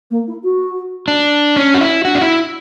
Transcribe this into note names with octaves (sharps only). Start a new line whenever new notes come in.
A#3
E4
F#4
D4
C#4 E4
F#4
E4
D4 F#4
D4
E4